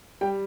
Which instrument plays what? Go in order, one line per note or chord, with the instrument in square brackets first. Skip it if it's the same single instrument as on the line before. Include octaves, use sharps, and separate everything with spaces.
[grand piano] G3 G5